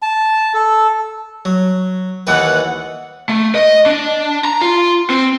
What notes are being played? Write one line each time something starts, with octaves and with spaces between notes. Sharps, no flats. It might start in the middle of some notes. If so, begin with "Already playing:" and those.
A5
A4
F#3
D#2 E3 B4 F#5
A3
D#5
D4
A#5
F4
C4